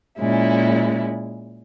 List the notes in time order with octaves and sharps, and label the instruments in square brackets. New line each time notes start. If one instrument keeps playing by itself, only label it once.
[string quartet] A#2 G#3 C#4 E4